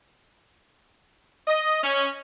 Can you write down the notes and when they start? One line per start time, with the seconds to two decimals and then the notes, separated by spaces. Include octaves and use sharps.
1.48 D#5
1.84 C#4